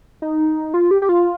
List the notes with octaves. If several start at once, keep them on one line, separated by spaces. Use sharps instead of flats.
D#4
F4
G4
G4
F4